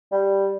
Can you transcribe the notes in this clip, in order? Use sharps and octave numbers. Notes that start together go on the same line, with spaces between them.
G3